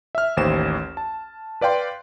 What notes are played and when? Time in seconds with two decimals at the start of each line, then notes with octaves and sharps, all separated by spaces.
0.15 E5 F6
0.37 A1 D#2 C5 E7
0.97 A5
1.61 B4 D5 F5 G5 C6